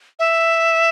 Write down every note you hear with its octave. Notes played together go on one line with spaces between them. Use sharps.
E5